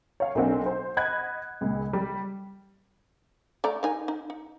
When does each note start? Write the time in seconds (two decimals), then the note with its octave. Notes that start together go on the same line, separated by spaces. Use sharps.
0.20 C#5 F5
0.35 B1 A#3 C4 D4 F#5
0.66 C5
0.97 D#5 F#5 B5 F#6 G#6
1.61 C#2 A#2
1.93 G3
3.64 A3 D5 A#5
3.83 D#3 D#4 G#5
4.08 D#4
4.30 D#4